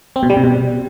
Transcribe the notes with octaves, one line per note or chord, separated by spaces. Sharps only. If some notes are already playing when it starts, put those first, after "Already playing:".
C4
B2
G3
C3
B2